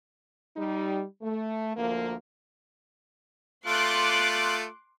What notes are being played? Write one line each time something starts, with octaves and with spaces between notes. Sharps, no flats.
G3 D#4
A3
D2 F3 A#3
A3 F4 C6 D6 F#6